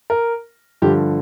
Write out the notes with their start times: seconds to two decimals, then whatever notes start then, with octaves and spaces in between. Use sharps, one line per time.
0.10 A#4
0.82 G2 D3 F3 G4